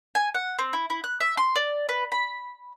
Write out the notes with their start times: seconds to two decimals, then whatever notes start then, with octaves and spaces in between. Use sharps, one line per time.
0.15 G#5
0.34 F#5
0.59 C4
0.73 E4
0.90 E4
1.04 F#6
1.20 E5
1.37 C6
1.56 D5
1.89 B4
2.12 B5